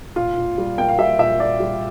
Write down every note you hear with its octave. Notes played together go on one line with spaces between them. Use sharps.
A#2 F4
A#2
G3
A#3 G5
F5
G3 E5
A#2 E5
A#2 D5
G3